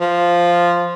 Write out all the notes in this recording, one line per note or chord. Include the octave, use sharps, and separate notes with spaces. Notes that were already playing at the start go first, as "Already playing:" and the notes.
F3